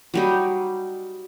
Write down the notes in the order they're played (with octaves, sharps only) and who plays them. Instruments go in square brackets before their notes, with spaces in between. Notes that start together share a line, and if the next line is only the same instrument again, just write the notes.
[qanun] F#3 G3 D#4